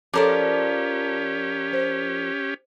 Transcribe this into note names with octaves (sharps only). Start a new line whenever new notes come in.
F3 C#4 G4 A4 A#4 C#5 D5 D6
C5